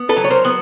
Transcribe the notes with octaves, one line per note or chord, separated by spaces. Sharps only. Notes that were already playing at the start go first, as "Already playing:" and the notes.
Already playing: B3
A4 B4
F#3
C#5
A#4 C5
B3